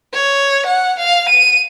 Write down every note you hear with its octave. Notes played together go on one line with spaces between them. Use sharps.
C#5
F#5
F5
D#7